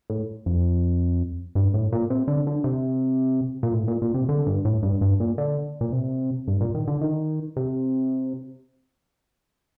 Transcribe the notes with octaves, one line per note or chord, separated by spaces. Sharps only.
A2
F2
G2
A2
A#2
C3
D3
D3
C3
A#2
A2
A#2
A#2
C3
D3
G2
A2
G2
G2
A#2
D3
A#2
C3
G2
A#2
D#3
D3
D#3
C3